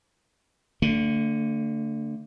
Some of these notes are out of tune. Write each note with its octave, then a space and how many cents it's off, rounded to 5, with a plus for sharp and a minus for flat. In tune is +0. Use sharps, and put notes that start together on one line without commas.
D3 +0 A3 +40